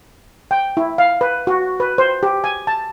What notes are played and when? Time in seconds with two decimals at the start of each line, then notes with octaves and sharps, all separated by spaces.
0.51 G5
0.77 E4
0.98 F5
1.21 B4
1.47 F#4
1.80 B4
1.98 C5
2.23 G4
2.44 G#5
2.67 A5